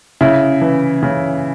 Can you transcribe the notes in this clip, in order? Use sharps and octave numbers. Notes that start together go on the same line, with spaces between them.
C#3 E4
E3
C#3